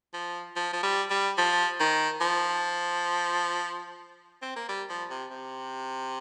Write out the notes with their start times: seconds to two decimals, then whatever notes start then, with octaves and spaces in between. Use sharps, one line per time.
0.13 F3
0.56 F3
0.73 F3
0.83 G3
1.10 G3
1.38 F3
1.80 D#3
2.21 F3
4.42 C4
4.56 A#3
4.69 G3
4.90 F3
5.10 C3
5.31 C3